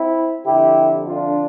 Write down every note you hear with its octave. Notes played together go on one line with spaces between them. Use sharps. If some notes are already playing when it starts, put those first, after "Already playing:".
Already playing: C4 E4
F2 D3 E4 G4
D4 F4